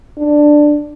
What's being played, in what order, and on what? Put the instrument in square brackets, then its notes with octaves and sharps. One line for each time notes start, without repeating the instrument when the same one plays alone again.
[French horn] D4